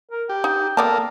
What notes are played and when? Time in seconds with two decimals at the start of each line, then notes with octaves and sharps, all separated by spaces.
0.11 A#4
0.29 G4 G5
0.44 D#4
0.77 A#3 B3 A4 A#4 D5 A5